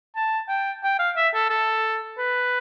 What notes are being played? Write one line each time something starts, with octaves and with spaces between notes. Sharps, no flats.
A5
G5
G5
F5
E5
A4
A4
B4